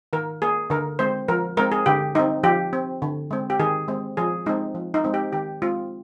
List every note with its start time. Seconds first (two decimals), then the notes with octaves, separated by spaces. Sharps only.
0.13 D#3 A#4
0.42 A#3 G#4
0.70 D3 A#4
0.99 G#3 C4 C5
1.28 F3 A#4
1.57 G#3 C4 A#4
1.72 G#4
1.86 D3 G4
2.15 G3 C4 D#4
2.43 F3 G4
2.73 C4
3.02 D3
3.31 G#3 C4
3.50 G4
3.59 D#3 G#4
3.88 G#3 C4
4.17 F3 G#4
4.46 G#3 C4 D#4
4.75 F3
4.94 D#4
5.04 G#3 C4
5.14 G4
5.32 D#3 G4
5.62 G#3 C4 F4